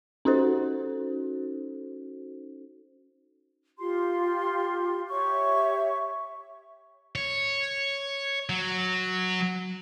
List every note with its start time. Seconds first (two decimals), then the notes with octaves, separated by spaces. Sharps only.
0.25 C#4 D#4 F#4 A4 C5
3.78 F4 G4 C6
5.09 G4 C#5 E5 C#6
7.15 C#5
8.50 F#3